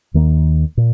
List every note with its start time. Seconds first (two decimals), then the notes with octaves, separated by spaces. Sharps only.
0.14 D#2 D#3 A#3
0.77 A#2